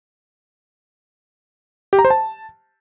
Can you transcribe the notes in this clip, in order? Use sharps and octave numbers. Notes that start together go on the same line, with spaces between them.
G4
A#5
C5
A5